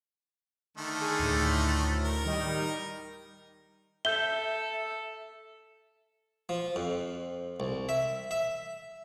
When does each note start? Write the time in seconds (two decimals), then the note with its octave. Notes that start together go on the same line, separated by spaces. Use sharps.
0.77 D3 D#3 A3
1.01 G#4
1.19 D2 A2
2.05 A#4
2.25 D#3 G3 D#4
4.05 A4 E5 G6 G7
6.49 F3
6.76 F2
7.60 C2
7.89 E5
8.31 E5